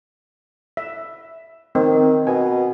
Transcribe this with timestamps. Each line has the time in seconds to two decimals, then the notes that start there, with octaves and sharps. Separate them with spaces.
0.77 E5
1.75 D#3 C4
2.27 B2 G#5